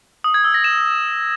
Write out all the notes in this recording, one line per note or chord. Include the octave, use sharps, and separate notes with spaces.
D#6
G#6
E6
A#6
E7